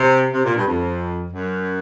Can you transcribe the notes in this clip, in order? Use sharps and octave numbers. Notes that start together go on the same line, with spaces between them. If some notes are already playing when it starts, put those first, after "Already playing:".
Already playing: C3
C3
A#2
G2
F2
F#2